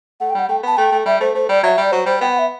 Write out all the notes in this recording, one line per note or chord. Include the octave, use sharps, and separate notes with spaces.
A3 F#5
G5
G3 F#5
A3 G5
B3 A5
A3 G5
A3
G3 E5
A3 C5
A3 C5
G3 D5
F#3 E5
G3
D5
F#3 C5
G3 C5
B3 G5
F#5
E5